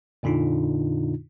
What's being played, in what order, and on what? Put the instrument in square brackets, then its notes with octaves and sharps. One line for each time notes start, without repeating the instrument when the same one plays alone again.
[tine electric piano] F2 A#2 D3 D4 D#4 F4